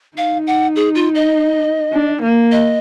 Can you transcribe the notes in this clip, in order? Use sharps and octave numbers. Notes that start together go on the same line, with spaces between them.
D#4 F5
F#5
G#4
F4
D#5
D4
A#3
D#5